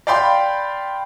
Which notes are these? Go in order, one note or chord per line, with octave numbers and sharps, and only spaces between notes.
D5 F5 G5 B5 C6